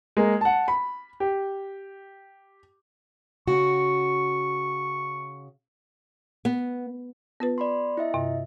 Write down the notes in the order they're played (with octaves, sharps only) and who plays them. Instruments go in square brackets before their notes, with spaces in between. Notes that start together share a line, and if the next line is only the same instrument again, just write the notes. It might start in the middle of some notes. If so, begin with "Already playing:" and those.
[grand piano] G#3 A#3
F#5 A5
B5
G4
[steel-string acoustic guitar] C#3 F#4 [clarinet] C#6
[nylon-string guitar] B3
[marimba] B3 F4 B4
[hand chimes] D5 B5 C6
E4 D#5 E5
[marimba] G2 C3